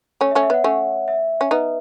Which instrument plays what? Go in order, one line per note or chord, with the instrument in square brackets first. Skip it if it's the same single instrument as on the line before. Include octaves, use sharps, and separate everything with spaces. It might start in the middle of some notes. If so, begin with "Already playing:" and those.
[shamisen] A3 C#4 [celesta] C#5
[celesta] E5
[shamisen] A3 C#4
[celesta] E5
[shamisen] B3 [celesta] F#5
[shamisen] A3 C#4 [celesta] F#5
[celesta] E5
[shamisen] C#4
[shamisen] B3 D#4 [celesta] B4